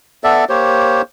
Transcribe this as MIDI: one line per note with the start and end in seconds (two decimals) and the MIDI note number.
0.24 0.45 59
0.24 0.45 69
0.24 0.45 74
0.24 0.45 76
0.49 1.02 58
0.49 1.02 67
0.49 1.02 72
0.49 1.02 73